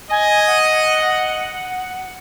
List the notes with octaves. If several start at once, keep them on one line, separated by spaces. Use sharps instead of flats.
D#5 G#5
F#5